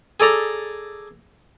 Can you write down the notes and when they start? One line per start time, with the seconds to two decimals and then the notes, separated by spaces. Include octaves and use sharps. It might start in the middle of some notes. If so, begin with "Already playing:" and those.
0.20 G#4 A4 D5 A#5